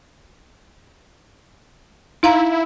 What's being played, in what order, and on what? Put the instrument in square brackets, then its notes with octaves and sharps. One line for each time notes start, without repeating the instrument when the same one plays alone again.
[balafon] D#4 F5 A#5 [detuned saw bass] E4